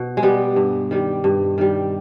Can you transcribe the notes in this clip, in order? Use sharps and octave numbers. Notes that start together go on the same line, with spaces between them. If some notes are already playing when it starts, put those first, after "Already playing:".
Already playing: B2
G#3
G3 B3
G2
D#3 G3
G2
D#3 G3